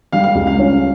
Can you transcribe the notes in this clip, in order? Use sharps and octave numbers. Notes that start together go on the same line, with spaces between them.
G3 F5
F5
C#2
F5
C#4